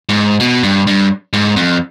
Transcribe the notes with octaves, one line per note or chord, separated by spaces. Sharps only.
G#2
B2
G2
G2
G#2
F2